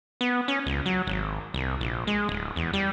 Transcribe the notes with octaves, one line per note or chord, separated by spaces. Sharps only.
B3
C#4
C#2
F#3
G#1
C2
A#1
G#3
D1
E2
G3